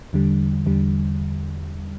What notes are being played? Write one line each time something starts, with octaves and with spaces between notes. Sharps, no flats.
E2 D3 G3
E2 D3 G3